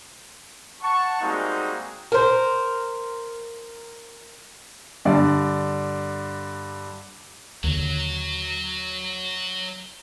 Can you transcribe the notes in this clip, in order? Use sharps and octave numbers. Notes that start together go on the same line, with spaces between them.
F#5 A5 C#6
G3 G#3 A#3 C4 D#4 F#4
A#4 C5
G2 D3 D5
D#2 D3 F#3